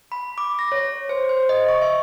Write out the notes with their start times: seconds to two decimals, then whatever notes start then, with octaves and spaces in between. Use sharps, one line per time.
0.12 B5
0.38 D6
0.59 A#6
0.72 C#5
1.09 C5
1.29 C5
1.49 D#5
1.68 C#6
1.82 E5